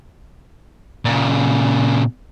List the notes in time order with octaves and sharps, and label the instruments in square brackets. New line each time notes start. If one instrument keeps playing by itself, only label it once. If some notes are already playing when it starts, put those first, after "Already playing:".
[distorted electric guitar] A#2 C#3